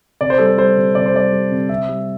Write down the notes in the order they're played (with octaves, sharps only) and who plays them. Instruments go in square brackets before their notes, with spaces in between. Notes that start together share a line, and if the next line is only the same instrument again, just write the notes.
[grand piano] C3 D5
C5
G3 A4
C5
G3 C5
C3
C3 D5
C5
G3 D5
G3
C3
C3 E5
G3